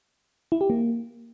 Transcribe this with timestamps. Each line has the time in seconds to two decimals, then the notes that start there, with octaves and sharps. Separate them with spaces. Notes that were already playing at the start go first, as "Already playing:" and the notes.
0.52 E4
0.61 G4
0.70 A#3